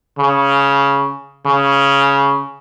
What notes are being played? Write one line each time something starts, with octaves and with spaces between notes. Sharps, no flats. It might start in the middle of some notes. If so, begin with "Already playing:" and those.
C#3
C#3